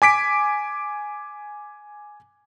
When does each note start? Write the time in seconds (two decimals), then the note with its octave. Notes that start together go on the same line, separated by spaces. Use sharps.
0.02 G#5 D6 B6 D7